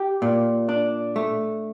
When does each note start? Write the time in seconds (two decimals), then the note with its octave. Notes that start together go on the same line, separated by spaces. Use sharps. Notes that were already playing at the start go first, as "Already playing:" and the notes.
Already playing: G4
0.22 A#2
0.69 D4
1.16 A3